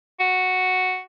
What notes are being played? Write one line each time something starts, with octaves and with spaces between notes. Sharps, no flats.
F#4